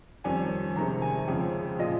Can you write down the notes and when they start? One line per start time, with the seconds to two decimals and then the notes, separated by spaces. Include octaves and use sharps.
0.24 F2 D#3 G3 C#4 G#5
0.76 F2 C3 D#3 G#3 A#5
1.02 G#5
1.27 F2 C#3 F3 G#3 G5
1.79 A#2 F3 G#3 D#5